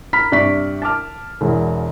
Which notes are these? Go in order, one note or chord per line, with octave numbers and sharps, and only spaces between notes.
A#5 B5 F6 B6
G2 C3 D5 E5 C#6 B6
A5 D6 F6
E1 E2